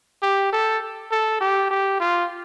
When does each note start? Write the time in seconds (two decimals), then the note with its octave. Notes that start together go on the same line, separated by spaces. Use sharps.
0.23 G4
0.53 A4
1.12 A4
1.41 G4
1.71 G4
2.00 F4